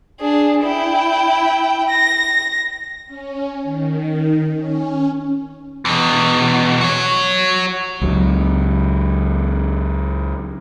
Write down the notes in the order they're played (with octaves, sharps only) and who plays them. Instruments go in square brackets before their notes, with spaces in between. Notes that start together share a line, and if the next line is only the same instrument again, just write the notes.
[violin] D4 G#4
E4 G5
A#6
[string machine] C#4
D#3
C#4
[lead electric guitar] E2 B2
F#4 C#5
[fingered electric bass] C#2 F#3